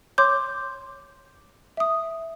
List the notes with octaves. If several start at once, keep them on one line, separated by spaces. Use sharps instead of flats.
C#5 C6 D6 G6
E5 D#6